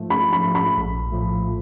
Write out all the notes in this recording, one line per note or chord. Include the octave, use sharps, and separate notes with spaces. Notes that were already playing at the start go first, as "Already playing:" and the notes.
Already playing: G#2 F3 A3
G#2 B5
B5
F3 A3
B5
A#1
A2 F3 A3